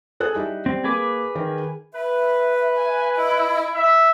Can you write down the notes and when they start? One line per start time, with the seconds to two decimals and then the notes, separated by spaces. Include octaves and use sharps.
0.20 G#4 A4 F#6
0.35 G3 D#4 E4
0.66 G3 C4
0.84 A#3 G#4 B4 D6
1.35 D#3 A#4
1.94 B4 E5
2.77 G#5
3.17 E4 D#5
3.75 E5